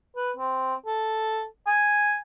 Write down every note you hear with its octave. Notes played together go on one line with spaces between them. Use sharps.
B4
C4
A4
G#5